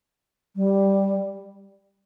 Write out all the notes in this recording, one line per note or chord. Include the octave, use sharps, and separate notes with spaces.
G3